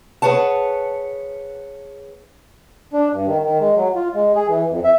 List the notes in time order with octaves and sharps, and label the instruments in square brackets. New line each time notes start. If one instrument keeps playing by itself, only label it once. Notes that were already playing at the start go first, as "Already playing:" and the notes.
[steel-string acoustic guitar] G#4 A#4 B4 C#5 F#5 A5
[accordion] D4
G2
D#3
D#3
G#3
F#3
F4
G#3
G#4
E3
F2
E5